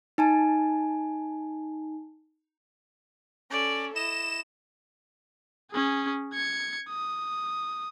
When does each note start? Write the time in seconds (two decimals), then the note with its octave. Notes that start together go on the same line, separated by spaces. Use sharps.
0.18 D#4 G#5 A5
3.51 C#4 A4 D5
3.96 E4 D#5 E7
5.72 C#4 G#4
6.34 G#6 C#7
6.89 D#6